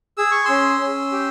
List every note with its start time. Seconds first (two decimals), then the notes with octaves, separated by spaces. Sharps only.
0.17 G#4 E6
0.31 C#6
0.45 C#4 C6 E6
0.81 C#4
1.12 G4